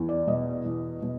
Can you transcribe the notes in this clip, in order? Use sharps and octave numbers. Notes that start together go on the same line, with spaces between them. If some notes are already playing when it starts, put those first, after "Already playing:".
Already playing: E2
D5
B2 D#5
E2
B2